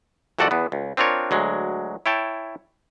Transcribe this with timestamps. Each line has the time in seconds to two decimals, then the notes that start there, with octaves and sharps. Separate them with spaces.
0.39 C2 F2 F#4 A4 D5 F#5
0.51 E2 B3
0.72 C#2
0.97 C4 D4 F4 A#4 C#5
1.31 D2 F#3 G#3
2.06 E4 C#5 G5 A5